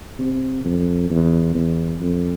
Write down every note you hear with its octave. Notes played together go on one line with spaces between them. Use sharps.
C3
F2
E2
E2
F2